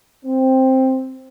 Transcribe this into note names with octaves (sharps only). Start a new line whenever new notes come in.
C4